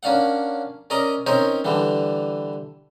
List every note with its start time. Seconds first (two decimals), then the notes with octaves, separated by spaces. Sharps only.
0.03 A#3 C#4 D4 F5 F#5
0.90 C#4 A#4 D5 D#5 A#5
1.27 C4 C#4 D#4 A#4 C5 C#5
1.64 D3 E3 G3